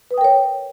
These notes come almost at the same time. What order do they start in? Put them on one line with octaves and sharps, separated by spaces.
B4 D#6 G5 A#4 C#5